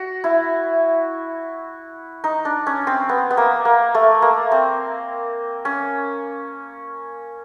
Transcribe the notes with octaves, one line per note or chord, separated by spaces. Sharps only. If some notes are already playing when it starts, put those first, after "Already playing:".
Already playing: F#4
E4
D#4
D4
C#4
C4
B3
B3
A#3
A#3
A3
A#3
C4
C#4